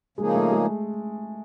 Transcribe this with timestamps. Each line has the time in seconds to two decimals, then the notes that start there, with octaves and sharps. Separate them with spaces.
0.18 C#3 F3 G#3 A#3 D#4 G#4
0.35 A3
0.52 G#3